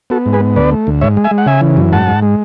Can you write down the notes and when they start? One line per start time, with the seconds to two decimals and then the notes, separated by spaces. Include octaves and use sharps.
0.10 B3 F#4 A4
0.26 G#2
0.33 G#4 B4
0.40 B3
0.56 D2 B4 D5
0.71 A3
0.87 D2
1.01 G#2 C#5 E5
1.17 G#3
1.24 E5 G#5
1.31 G#3
1.38 F#5
1.46 C#3 E5 G#5
1.61 E3
1.77 F#2
1.92 G#2 F#5 A5
2.07 G#2
2.22 G#3